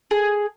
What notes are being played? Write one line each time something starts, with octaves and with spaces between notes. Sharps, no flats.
G#4